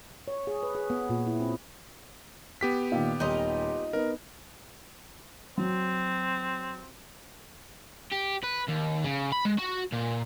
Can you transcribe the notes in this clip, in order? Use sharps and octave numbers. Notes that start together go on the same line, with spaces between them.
C#5
G#4
B4
G#4
B3
A#2
E4
C4
B3 G4 B6
A#2 D#3
D#1 D#4 F4 D#5
B3 D#4 A#4
F#3 C4
G4
B4
D#2
C#3
B5
G#3
F#4
A#2